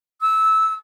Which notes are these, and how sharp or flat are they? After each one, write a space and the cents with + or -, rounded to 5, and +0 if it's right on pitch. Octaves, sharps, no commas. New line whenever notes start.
E6 -15